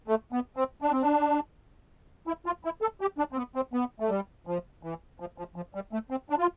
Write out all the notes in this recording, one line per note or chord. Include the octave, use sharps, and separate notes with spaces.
A3
B3
C4
D4
C4
D4
E4
F4
E4
A4
G4
D4
C4
B3
C4
B3
A3
G3
F3
E3
F3
F3
F3
G3
A3
C4
D4
F4